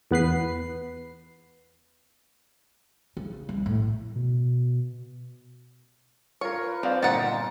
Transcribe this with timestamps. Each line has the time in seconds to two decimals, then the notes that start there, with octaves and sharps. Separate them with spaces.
0.11 E2 B3 B4 C7
3.17 C#3
3.49 C2
3.66 A2
4.16 B2
6.41 F4 A#4 C#5
6.62 B4
6.83 F3 C4 D5 F5
7.03 G1 A#2 D#3 B3 F#5 A#5 A6